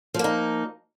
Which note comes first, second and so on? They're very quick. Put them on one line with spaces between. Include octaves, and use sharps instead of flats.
F3 A#3 D#4